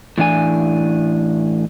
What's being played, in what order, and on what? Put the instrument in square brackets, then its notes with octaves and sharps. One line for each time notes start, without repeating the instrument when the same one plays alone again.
[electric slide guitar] A2 E3 D4 G#5